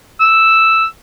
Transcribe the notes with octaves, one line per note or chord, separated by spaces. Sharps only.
E6